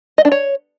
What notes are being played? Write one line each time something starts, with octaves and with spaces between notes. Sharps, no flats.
D#5
D4
C#5